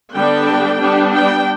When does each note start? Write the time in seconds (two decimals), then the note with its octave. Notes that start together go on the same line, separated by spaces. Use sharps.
0.13 D3 G3 B3 D4 G5
0.80 G3 B3 D4
1.12 G5